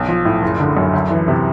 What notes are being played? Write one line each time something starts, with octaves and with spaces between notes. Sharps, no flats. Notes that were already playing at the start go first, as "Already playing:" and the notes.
Already playing: B1
F3
A2
F#1
D3
F#2
D2
E3
C3